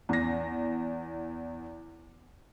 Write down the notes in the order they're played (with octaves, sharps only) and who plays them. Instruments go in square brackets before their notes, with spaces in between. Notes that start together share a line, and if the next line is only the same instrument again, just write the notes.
[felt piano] E2 A#6